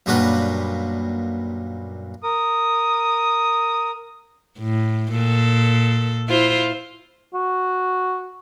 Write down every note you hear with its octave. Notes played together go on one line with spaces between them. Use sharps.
F#2 A#2 G3 D4 F#4 B4
A#4 D#6
A2
A#2 A4
E4 F4 C5
F#4